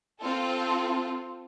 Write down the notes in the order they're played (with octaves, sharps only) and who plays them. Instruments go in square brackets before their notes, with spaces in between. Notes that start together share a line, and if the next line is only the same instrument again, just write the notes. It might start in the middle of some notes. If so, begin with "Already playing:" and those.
[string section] C4 F4 A4